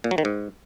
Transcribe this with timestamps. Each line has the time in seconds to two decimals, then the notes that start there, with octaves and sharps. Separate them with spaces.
0.04 A#2
0.11 F#3
0.18 D#3
0.25 G#2